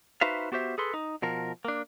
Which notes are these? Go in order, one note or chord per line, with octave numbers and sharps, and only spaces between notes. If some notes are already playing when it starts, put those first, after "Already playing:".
D#4 F#4 B4 C5 E5 F5
B3 F#4 G4 C5 E5
G#4 A4 B4 C6
D#4
B2 F3 A#4
A#3 D4